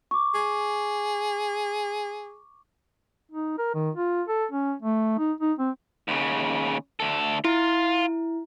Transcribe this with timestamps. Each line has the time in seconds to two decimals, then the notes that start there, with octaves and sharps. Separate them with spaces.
0.11 C#6 D6
0.35 G#4
3.31 D#4
3.58 A#4
3.74 D#3
3.95 F4
4.28 A4
4.51 C#4
4.82 A3
5.19 D#4
5.41 D#4
5.59 C4
6.08 D#2 C#3
7.00 D2 A4
7.44 E4 F4